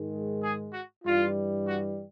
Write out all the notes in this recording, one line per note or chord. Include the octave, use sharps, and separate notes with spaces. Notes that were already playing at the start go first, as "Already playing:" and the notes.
Already playing: G#2 D#3 G#3
G#4
F#4
G2 E3 G3 F4
F#4